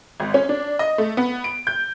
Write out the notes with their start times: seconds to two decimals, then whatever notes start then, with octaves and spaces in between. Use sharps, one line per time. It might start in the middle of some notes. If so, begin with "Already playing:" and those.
0.20 G#1
0.34 C#4
0.49 D4
0.79 D#5
0.98 A3
1.17 B3
1.44 D7
1.67 G6